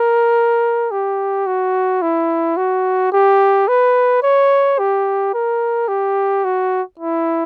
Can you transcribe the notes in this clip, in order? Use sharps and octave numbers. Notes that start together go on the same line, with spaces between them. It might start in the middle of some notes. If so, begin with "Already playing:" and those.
Already playing: A#4
G4
F#4
E4
F#4
G4
B4
C#5
G4
A#4
G4
F#4
E4